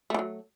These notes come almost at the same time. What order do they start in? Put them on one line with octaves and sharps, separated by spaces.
A3 E3 F#3